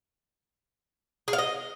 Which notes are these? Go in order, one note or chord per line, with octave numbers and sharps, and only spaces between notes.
G#4
F5
D#5